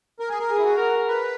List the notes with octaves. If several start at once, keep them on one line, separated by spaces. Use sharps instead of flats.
A#4
G#4
A#4
G#4
E4
F#4
A#4
B4